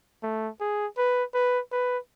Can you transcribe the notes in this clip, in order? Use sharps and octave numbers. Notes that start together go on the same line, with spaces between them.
A3
G#4
B4
B4
B4